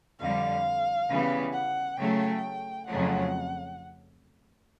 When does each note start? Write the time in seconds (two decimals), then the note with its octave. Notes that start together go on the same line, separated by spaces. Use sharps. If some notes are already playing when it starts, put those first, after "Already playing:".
0.19 F2 D3 G3 F5
1.08 C#3 E3 G3 B3
1.53 F#5
1.97 C#3 F#3 A3 G5
2.87 F2 C#3 F#3 A3 F#5